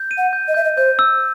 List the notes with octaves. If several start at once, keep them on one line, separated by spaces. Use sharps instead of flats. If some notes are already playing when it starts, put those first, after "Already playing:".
Already playing: G6
D#7
F#5
G6
D#5
E5 G6
D#5
C5 G6
E6